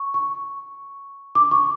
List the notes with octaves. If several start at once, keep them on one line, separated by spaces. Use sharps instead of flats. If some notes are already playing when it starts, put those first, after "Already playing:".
Already playing: C#6
C#6
D6
C#6